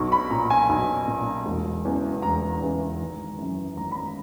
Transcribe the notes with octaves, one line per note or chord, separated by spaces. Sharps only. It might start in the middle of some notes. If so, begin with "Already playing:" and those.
Already playing: B1 C#6
B5
A#2 A#5
G#5
B1
A#2
E1
E2 C#3 E3
E1 A#5
E2 C#3 E3
G#1
F#2 E3
G#1 A#5
B5
A#5